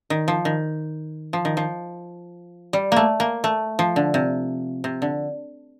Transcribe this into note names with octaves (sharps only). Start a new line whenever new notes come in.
D#3
F3
D#3
F3
D#3
F3
G3
A3 A#3
A#3
A3
F3
D3
C3
C3
D3